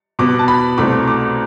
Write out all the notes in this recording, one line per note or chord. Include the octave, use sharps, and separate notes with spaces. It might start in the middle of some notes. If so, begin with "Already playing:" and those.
B2 B3 D6
A5
B5
C2 B2 A3 C4 D6
D6